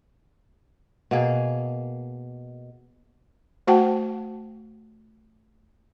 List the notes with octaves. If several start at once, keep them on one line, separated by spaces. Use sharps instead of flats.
B2 A#3 G#4
A3 F#4 C5 F#5 G5 A5